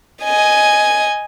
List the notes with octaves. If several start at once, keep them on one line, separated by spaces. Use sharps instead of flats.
D#5 G#5